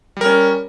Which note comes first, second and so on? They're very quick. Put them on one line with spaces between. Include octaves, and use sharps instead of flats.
G3 A#4 C#4